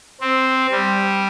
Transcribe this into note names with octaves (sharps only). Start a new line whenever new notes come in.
C4
G3